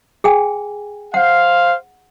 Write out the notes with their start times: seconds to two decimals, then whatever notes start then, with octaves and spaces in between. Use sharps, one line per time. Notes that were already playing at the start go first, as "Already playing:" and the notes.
0.24 G#4 G5 G#5
1.14 C5 F5 F#5